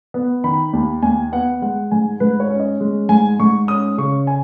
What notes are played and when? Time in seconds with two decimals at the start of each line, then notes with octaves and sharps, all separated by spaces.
0.14 B3
0.44 D#3 B5
0.73 D#2
1.03 D#2 G#5
1.32 B3 F#5
1.62 G#3 F#5
1.91 G#2 G#5
2.20 G#2 B4
2.40 C#5
2.50 C#4
2.60 D#5
2.81 G#3
3.09 G#2 G#5
3.39 G#2 C#6
3.68 C#4 D#6
3.98 C#3 C#6
4.27 G#5